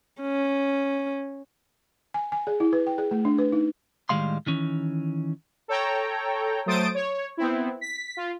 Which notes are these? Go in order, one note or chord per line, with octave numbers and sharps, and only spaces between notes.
C#4
G#5
G#5
G#4
E4
B4
G5
G#4
A3
D4
B4
D#4
A2 D#3 G3 G#3 F5 C6
D#3 E3 C#4
A4 C#5 G5 A#5
F#3 A3 C5 D#6 A6 D7
C#5
B3 C4 E4
B6
F4